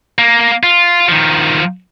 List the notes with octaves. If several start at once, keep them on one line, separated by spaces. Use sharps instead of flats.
A#3
F4
D#3 F3